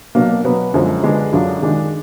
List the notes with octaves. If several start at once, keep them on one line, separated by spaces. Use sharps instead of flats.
B2 F#3 A#3 D4
B2 F#3 B3
F#2 D3 F3 G#3
D3 G#3 B3 D4
F#2 D3 F#3 D4 F4
D#3 G#3 D4